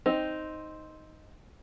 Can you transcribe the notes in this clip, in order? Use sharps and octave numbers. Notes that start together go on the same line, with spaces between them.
C4 D#4